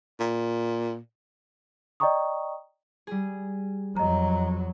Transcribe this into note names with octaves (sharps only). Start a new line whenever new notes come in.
A#2
D5 D#5 G5 A#5 C#6 D#6
G3 G#4
F2 F#3 D#5 A#5